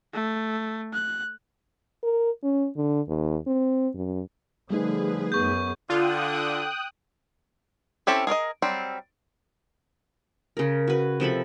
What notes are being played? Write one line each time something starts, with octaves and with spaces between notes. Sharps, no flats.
A3
F#6
A#4
C#4
D3
D#2
C4
F#2
D3 F3 G3 A3 D#4 G#4 B4
F#2 B3 C#6 G6
D3 F4 G5 D#6 F#6
C4 C#4 E4 G4 A4
G#4 A#4 D5 D#5
F#3 G3 C4
C#3 A#4
F#4 B4
C3 F3 A4 B5